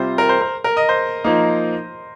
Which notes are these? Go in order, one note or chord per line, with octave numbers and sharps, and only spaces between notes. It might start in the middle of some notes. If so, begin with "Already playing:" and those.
Already playing: C3 G3 C4 F4 C5
A#4
C5
A#4
A#4
D#5
C5
F3 A#3 D#4